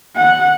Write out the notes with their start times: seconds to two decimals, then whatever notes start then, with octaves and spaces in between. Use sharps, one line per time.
0.17 F#5